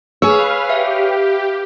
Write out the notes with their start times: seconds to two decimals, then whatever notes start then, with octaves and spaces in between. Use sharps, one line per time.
0.22 G#4 B4 C#5 F5 E6 F6
0.69 G4 B4 E5 F5